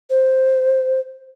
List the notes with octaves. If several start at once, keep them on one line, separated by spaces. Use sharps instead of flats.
C5